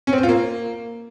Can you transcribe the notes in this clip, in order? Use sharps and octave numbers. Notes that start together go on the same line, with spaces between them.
C#4
C4
C5
F4
A#3